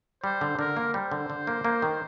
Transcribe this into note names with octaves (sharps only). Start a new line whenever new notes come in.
G3 C5
D3
D3 A#4
A#3
G3 C5
D3
D3
A#3
A#3
D#3